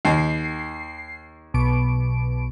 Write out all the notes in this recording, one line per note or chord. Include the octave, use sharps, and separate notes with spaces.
D#2 C7
B1 B2 D7